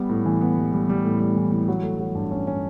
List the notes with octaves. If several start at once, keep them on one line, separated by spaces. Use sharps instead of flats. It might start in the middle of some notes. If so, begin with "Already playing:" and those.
Already playing: G3 B3
A2
E3
B3
G3
G3
G3
A2
G3
E3
E3
F#3
A3
F#3
G2
C#4
C#4